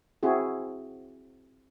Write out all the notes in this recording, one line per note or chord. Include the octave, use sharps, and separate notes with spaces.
C4 E4 F#4 G#4